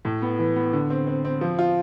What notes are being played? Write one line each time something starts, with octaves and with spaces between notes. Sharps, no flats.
A2
B3
E3
B3
D3
C4
C4
C4
F3
F4